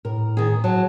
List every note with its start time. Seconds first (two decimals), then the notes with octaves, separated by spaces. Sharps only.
0.05 A2 A#4
0.37 D#3 G#4
0.64 F#3 A5